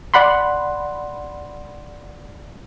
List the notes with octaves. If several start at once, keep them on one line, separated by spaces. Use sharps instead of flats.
D5 F#5 B5 C6